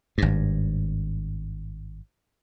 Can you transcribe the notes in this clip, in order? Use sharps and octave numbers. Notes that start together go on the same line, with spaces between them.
G#1 G2